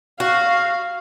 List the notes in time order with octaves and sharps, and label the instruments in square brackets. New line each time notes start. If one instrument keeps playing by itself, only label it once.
[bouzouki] F#4 [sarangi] F5